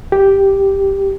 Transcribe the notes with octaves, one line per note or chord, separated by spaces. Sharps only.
G4